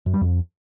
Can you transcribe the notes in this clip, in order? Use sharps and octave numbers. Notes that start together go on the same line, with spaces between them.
F#2
G3
F2